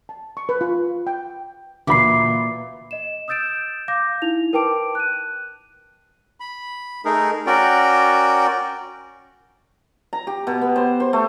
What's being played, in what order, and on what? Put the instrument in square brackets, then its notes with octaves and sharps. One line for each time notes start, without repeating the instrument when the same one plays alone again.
[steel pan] A5
C#6
B4
F4
G5
[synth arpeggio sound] D2 F#4 B5 [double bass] A#2 [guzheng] E3 [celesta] D6 C7
[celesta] D#5 E7
D#6 E6 G6 A6 D7 E7
F5 D6 G6 A#6
D#4 E4 F7
A#4 B4 G5 A5 D6 D7
F#6 D#7
[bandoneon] B5
A3 D#4 G#4 A#4
C#4 F#4 A#4 D5 G5
[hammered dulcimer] A#5
G4
B2
B3
C5
C5
A3